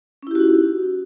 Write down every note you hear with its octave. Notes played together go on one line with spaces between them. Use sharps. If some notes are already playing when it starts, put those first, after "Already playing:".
C#4 D#4 E4 F#4 G4